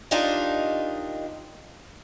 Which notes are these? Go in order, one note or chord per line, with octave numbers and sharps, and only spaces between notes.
D4 D#4 F4 G4 A#4 D#5